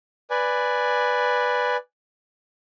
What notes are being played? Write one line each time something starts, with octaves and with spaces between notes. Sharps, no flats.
B4 D5 G#5